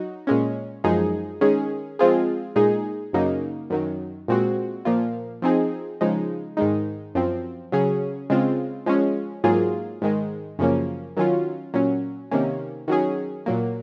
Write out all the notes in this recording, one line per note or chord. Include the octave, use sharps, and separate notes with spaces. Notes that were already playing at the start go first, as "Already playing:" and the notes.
Already playing: F#3 D#4 F#4
A#2 G#3 C#4
F#2 F3 G#3 D#4 G#4
D#3 G#3 C#4 G#4
F3 G#3 C4 F4 G#4
A#2 G#3 D#4 G#4
F#2 C#3 F#3 A#3 D#4
F#2 D#3 F#3
A#2 G#3 C4 F#4
A#2 F3 A#3 F4
F3 C4 D#4 G#4
C#3 F3 G#3 D#4
G#2 D#3 G#3 D#4
F#2 F3 C4
C#3 F#3 C#4 G#4
C#3 G#3 C4 F4
F3 G#3 C#4
G#2 F#3 A#3 F4 G#4
G#2 D#3 G#3
F#2 C#3 F3 A#3 C#4
D#3 F#3 C#4 F4
A#2 F#3 C#4
C3 D#3 A#3 C#4
D#3 F#3 C#4 G#4
A#2 F#3 A#3